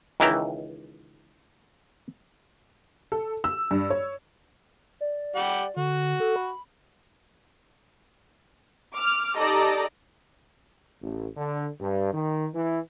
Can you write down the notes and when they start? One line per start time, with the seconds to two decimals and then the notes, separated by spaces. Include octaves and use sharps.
0.20 C#2 D#3 E3 E4 G5 A#5
3.12 A4
3.44 E6
3.71 G2
3.90 C#5
5.01 D5
5.36 G3 G4 F#5
5.77 D3 F#4
6.20 A4
6.36 B5
8.94 D6 F6
9.37 D#4 G4 A4 D5 D#5 A#5
11.02 A1
11.37 D3
11.80 G2
12.14 D#3
12.55 E3